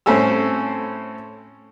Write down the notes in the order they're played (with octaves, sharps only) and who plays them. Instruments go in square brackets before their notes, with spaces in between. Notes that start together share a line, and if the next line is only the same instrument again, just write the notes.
[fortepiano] A2 C4 C#4 A4 G#5 E6